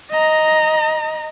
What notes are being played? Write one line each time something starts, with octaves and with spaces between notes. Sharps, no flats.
D#5 A#5